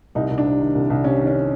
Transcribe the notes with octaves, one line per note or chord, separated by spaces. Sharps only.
C2 D#4
C2
D4
C3
D#3
C2
C2
C3 C#4
D#3
C#4